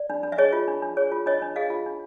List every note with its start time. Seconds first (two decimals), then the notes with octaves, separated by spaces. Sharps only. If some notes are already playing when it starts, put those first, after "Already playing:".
Already playing: D5
0.10 D4
0.23 D4
0.32 E5
0.38 G#4 C#5 D#5
0.53 F4
0.68 D4
0.82 D4
0.97 G#4 C#5
1.12 F4
1.26 D4 C#5 D#5
1.42 D4
1.56 G#4 D#5 F5
1.70 F4
1.86 D4